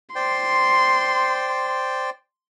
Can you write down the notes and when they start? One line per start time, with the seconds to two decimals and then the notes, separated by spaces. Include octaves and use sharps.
0.16 C5 D5 G5 C6